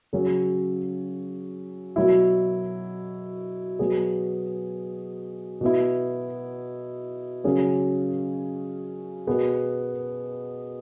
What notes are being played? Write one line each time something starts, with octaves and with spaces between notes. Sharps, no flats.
C#3 F#3 C#4 G#4
B2 F#3 E4
B2 F#3 B3 G#4
B2 B3 E4
C#3 F#3 C#4 G#4
B2 B3 G#4